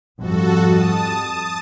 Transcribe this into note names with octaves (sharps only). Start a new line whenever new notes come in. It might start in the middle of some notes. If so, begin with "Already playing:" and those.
F2 G#2 G3 F#4 A4
A5 D#6